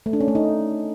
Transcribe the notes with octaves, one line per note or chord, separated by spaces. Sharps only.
A3
D4
C#4
A3
D#4